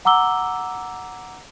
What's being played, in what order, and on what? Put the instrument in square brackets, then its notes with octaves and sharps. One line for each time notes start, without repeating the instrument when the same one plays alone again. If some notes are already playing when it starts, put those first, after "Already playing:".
[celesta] F#5 A#5 D6 E6 G7